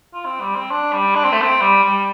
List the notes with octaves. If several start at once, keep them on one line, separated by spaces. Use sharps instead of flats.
F4
C4
G3
C4
D4
G3
D4
C4
A3
C4
G3
G3